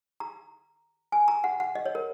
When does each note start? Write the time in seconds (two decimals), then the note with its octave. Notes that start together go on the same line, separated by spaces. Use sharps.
0.20 A#5
1.12 G#5
1.28 A#5
1.44 F#5
1.60 F#5
1.75 D#5
1.85 C#5
1.95 A#4